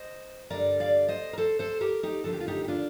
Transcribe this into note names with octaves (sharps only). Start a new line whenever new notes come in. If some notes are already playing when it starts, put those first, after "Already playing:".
Already playing: C5 D#5
G2 D3 G3 A#4 D5
D5 F5
C5 D#5
A#4
A4 C5
A4 C5
G4 A#4
D#4 G4
D#2 D3 F3 A4
G4
F4
D#4 G4
G4
D4 F4